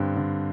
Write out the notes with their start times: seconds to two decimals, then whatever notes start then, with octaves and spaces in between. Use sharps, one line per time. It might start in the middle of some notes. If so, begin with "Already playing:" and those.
Already playing: G2 D3 C4
0.16 D3